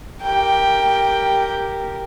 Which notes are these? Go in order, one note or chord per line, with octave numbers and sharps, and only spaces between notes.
G4 A#4 G5